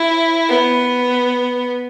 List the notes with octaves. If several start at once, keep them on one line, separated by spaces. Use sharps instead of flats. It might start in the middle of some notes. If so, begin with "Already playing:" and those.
Already playing: E4
B3